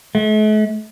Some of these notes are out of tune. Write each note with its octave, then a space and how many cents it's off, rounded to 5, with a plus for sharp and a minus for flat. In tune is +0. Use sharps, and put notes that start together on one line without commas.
A3 -45